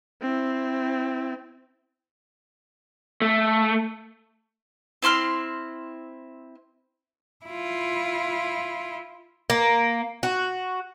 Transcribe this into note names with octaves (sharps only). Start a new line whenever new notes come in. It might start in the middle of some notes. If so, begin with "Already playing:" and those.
C4 E4
A3
C4 E4 C6 F6
E4 F4
A#3
F#4